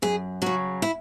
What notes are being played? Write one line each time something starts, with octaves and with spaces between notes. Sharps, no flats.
F#2 G#4
C#3 F#3 F#4
E4